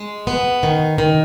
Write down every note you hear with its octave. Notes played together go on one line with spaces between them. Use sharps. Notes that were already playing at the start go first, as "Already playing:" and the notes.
Already playing: G#3
B3
D#3
D#3